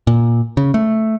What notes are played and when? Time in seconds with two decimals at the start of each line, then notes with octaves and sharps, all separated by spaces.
0.07 A#2
0.57 C#3
0.74 A3